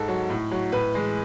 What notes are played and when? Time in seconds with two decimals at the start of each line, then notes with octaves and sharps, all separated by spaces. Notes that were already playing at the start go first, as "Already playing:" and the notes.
Already playing: G#2 A4
0.08 F#3
0.30 A2
0.51 F#3
0.72 A2 B4
0.95 E3 G#3